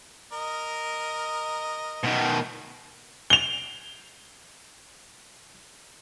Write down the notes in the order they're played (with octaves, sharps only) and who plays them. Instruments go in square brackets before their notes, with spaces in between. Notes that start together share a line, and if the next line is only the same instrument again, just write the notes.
[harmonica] A#4 D#5
[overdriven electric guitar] B2 D#3
[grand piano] F7 G7